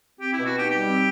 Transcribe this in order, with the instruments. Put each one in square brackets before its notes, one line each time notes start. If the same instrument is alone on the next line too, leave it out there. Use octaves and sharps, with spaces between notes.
[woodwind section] C4 [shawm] G4
[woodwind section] B2 [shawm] E4
[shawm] F#4
[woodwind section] D#4 [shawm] G4
[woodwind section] G3 [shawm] G4
[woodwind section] C4